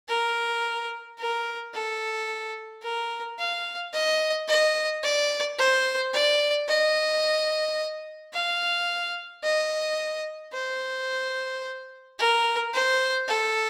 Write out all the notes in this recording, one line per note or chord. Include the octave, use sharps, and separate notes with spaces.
A#4
A#4
A4
A#4
F5
D#5
D#5
D5
C5
D5
D#5
F5
D#5
C5
A#4
C5
A4